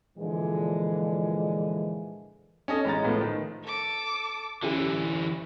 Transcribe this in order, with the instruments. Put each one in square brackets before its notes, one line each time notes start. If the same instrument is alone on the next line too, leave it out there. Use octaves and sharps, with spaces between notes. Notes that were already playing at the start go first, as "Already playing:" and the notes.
[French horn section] A#2 D3 E3 F3 G#3
[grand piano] C#4 A4 D#5
A1 G#3 C#4 A#5 A6
A2 F3 A3 B3
D#3
[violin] A4 D6
[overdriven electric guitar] D3 E3 [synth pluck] C#4 E4 G4